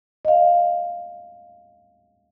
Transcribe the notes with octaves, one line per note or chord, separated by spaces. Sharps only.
D#5 F5